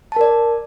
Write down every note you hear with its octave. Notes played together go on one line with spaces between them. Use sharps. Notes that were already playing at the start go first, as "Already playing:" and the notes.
A#4 D5 A5